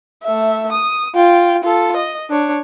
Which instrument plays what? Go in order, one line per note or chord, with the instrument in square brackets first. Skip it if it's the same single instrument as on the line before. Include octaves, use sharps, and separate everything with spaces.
[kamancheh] A3 E5
D#6
F4 G5
F4 A4
D#5
D4 C#5